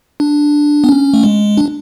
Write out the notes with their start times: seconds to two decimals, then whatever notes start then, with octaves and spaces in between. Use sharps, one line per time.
0.20 D4
0.84 B3
0.89 C#4
1.14 A3
1.24 G#3
1.57 D4